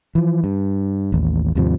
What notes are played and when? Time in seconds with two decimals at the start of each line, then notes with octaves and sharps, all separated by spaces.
0.15 E3 F3
0.44 G2
1.12 A1 D#2
1.55 D#2 G#2 C3 F3